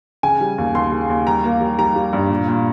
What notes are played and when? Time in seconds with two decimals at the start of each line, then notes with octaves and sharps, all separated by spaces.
0.23 C#3 G#5
0.41 G3
0.58 D#2
0.75 D#2 C6
0.92 C#3
1.09 D#2
1.27 G3 A#5
1.44 A#3
1.61 G3
1.79 G3 A#5
1.96 G3
2.13 G2
2.30 A#2
2.48 A#2